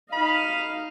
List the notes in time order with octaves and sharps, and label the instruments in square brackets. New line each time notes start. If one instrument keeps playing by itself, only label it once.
[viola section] D#4 D#5 F5 [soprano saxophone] B5